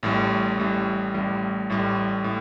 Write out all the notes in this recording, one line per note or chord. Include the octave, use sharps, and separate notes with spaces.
A1 A2 G3
A1 A2 G3
A1 A2 G3
A1 A2 G3
A2